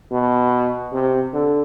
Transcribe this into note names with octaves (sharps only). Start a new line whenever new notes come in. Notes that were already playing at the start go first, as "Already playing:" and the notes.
B2
C3
D3